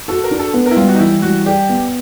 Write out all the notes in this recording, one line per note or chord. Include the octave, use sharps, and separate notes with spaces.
F#4 A4
A#4
D4
A4
B3
A#4
E4
G3 F4
F#4
D#4
E3 E4
G3 F#4
G4 D5
B3